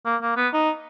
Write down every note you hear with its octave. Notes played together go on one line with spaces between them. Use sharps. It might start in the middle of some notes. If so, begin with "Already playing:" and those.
A#3
A#3
B3
D#4